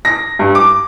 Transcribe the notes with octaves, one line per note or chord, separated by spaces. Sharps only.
A#6
G2
D6